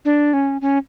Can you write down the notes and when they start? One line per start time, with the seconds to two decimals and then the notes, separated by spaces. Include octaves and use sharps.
0.05 D4
0.33 C#4
0.61 C#4